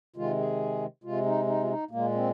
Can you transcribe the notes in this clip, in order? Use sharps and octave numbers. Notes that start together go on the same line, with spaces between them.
C3 D#3 G#3 F4
G#4
C3 G#3 F4
D#4
D#4
F4
D#4
A#2 G#3 A#3
C4